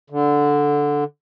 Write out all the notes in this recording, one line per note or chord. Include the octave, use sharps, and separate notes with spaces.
D3